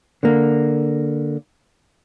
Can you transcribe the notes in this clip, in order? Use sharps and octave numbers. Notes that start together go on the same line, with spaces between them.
D3 A#3